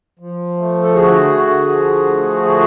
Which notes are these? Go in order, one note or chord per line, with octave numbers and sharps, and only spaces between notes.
F3
A3
A4
D3 F#4 G#4
D3
F3
A3
D3 F#4 G#4